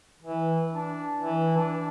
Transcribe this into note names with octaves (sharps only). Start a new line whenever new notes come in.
E3
D4
E3
D4